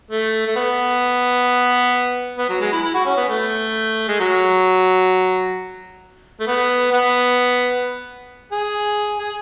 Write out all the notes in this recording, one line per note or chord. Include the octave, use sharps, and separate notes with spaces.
A3
A3
B3
B3
F#3
G#3
E4
E4
F#4
C#4
B3
A3
G#3
F#3
A3
B3
B3
G#4
G#4